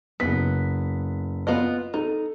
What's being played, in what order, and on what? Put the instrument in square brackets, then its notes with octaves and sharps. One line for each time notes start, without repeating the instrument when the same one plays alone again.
[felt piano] F#1 B6 [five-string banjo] B3
[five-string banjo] B3 F4 D#5
[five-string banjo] D#4 [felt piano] A4